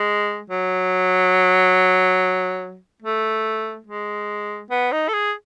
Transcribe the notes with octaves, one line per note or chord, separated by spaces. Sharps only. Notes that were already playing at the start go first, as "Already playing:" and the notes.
Already playing: G#3
F#3
A3
G#3
B3
D#4
A4
G#4